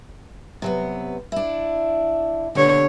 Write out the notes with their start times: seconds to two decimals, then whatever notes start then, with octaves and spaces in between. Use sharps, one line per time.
0.62 C3 F#3 B3
1.32 D4 E4
2.55 B2 D3 G4 C#5